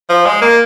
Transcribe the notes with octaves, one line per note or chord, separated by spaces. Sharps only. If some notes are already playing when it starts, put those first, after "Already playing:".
F3
G#3
A#3